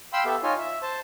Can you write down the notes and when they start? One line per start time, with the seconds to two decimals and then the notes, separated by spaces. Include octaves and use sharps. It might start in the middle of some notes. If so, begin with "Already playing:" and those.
0.13 F5 G5 B5 C6 E6
0.25 B3 G4 A4 E5
0.43 D#4 F4 C#5 G#5
0.59 E5
0.82 C5 A5